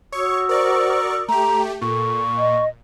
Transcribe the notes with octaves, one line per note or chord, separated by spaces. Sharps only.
F#4 C#5 C#6 D#6 E6
A#4 C5 D5 C#6
A3 G4 A#5
A#2 A4 A#4 C#6
D#5